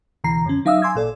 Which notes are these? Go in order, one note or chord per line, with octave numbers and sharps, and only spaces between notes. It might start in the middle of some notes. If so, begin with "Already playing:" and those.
C#2 B2 D3 E3 A#5 C7
F#2 D3 C#4
F#3 D#4 E5 F5 D#6 E6
G#5 C6 D6 E6 G#6
G#1 A#2 A4 D5